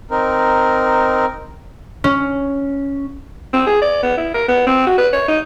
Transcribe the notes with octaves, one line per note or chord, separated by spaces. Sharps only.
C4 D#4 A#4
C#4
C4
G#4
D5
B3
E4
A#4
B3
C4
F#4
B4
C#5
D#4